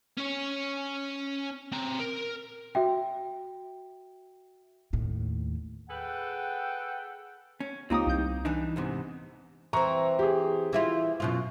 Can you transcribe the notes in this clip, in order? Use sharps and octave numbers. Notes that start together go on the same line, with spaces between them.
C#4 C#5
C4 A#5
A#4
F#4 E5 G5
D#2 A2
G#4 A4 B4 F#5 G5
C#4
C#2 A#3 C4 D#4 G4 D#6
C2 G6
E3 D4 D#4
E2 G#2 C3
E3 C4 A#5 C#6
G4 G#4
E3 E4 F4
F#2 B2 F4